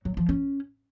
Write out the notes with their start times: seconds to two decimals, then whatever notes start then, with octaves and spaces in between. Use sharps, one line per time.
0.05 F#3
0.17 F3
0.29 C#4